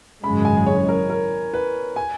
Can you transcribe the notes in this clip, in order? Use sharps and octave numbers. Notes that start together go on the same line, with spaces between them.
G#1 F#2 C#3 G#3 B5
G#5
C#5
A#4
A#4
B4
G#5